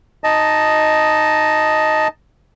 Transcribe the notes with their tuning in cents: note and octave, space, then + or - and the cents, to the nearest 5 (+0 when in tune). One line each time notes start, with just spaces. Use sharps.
D#4 +0 D#5 +0 A5 +0